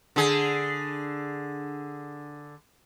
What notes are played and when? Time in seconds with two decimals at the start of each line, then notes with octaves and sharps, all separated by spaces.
0.16 D3 G#4